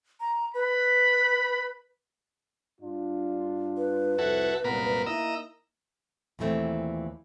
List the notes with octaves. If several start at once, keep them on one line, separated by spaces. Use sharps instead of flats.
A#5
B4 B5
G2 D4 F4
B4
C2 F2 E4 F#4 A4
C2 F#2 A#2 B3 A#4 B5
A#3 D#4 E4 D#5 A#5 E6
D#2 A#2 E3 A3 C4